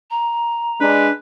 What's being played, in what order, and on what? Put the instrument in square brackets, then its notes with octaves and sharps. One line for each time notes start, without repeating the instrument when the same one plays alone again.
[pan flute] A#5
[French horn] G#3 [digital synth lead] D4 [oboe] B4